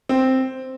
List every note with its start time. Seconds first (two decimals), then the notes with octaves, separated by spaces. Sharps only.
0.09 C4